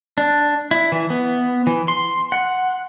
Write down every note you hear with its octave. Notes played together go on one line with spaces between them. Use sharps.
D4
E4
E3
B3
E3
C6
F#5